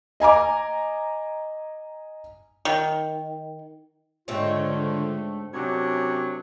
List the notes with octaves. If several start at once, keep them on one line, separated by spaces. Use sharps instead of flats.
D#5 G#5 A#5 D6
D#3
G#2 D3 G#3 A3 C4 D4 F4 C#5
F#2 C3 F#3 D4 C#5